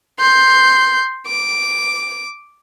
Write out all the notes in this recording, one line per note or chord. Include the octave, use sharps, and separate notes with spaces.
C6 G6
D6